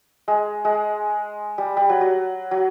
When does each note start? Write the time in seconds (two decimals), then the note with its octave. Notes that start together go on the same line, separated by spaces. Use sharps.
0.28 G#3
0.65 G#3
1.58 G3
1.77 G3
1.89 F#3
2.01 F#3
2.51 F#3